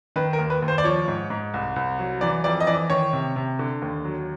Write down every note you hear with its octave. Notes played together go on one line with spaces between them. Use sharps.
D#3 B4
A#4
D#2
B4
D#2
C5
D5
F3 C#5
G#2
G#2
C2
C2
F#3
E3 D5
F2 D5
D#5
E3 D5
D#3 C#5
C3
C3
D3
D#2
F#3